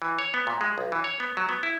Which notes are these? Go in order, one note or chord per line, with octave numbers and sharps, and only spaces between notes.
E3
C#5
B3
A#2
G#3
B1
E3
C#5
B3
F#3
B3
E4